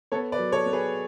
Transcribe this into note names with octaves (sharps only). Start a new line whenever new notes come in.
B3 A4 C#5
B4 D5
F#3
A4 C#5
B3
G#4 B4